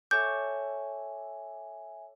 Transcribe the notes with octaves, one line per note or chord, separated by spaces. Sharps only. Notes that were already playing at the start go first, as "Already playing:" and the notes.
A4 C#5 E5 G#5 D6 G6